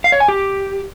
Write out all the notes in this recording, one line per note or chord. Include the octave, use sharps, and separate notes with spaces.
F5
C#5
G#5
G4